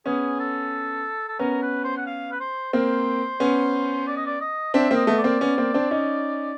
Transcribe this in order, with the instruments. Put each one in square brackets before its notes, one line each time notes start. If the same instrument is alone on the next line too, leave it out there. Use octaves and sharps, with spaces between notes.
[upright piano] B3 C#4 [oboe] G#4
[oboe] A4
A4
[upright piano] B3 C#4 [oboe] A#4
[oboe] B4
C5
F#5
F5
B4
C5
[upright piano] A#3 C4 [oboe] C5
[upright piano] B3 C#4
[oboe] D5
D#5
D5
D#5
[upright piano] C4 D4 [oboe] E5
[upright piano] A#3 C4
[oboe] D#5
[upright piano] A3 B3
[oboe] D5
[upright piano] A#3 C4
B3 C#4
A#3 C4
C4 D4
C#4 D#4